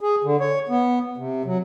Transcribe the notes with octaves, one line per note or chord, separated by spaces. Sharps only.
G#4
D3
C#5
B3
C3
F#3